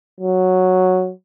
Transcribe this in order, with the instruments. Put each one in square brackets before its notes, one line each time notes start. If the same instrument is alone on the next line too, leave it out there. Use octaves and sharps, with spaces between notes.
[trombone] F#3